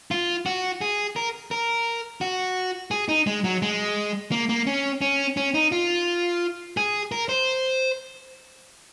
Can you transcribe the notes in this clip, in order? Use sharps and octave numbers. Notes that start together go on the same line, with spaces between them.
F4
F#4
G#4
A#4
A#4
F#4
G#4
D#4
G#3
F#3
G#3
A#3
A#3
C#4
C#4
C#4
D#4
F4
G#4
A#4
C5